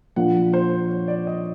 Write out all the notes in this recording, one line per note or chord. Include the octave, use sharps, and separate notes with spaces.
A#2 F3 A#3 D4 F4 F#5
C5
C#5
D5
D#5